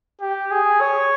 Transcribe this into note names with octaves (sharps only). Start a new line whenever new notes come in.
G4
G#4
C#5